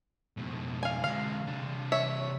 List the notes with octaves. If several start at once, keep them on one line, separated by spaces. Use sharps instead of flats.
F2 B2
F5 G#5
D3 G#3 F5
C3 D4
C#5 E5